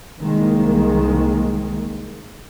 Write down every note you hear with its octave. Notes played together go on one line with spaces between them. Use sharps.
C2 D#3 G#3 A#3